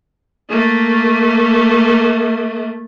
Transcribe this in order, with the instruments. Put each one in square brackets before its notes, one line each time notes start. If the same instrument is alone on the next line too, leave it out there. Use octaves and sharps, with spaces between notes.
[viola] A3 A#3